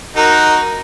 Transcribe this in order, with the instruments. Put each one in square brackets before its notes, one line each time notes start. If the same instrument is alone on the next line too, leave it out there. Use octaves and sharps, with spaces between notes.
[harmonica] D#4 F#4 A#4